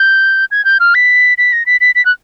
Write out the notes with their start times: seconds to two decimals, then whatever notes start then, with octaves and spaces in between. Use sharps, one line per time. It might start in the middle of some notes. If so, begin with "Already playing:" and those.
Already playing: G6
0.51 G#6
0.65 G6
0.80 F6
0.95 B6
1.38 B6
1.53 A#6
1.66 B6
1.81 B6
1.95 B6
2.05 F#6